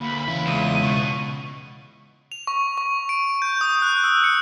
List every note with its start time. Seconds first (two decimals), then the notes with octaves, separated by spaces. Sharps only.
0.01 D2 A#3 B5
0.28 E2 C#3 E4 F5
0.47 C#2 D#7
0.83 B2 C#6
2.32 F7
2.47 C#6
2.78 C#6
3.09 D7
3.42 G6
3.61 D#6
3.82 F#6
4.04 E6
4.24 C#7